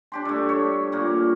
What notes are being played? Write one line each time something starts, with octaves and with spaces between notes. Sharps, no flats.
D4 G4 C6
G2 A3
C#5
A#2 A#3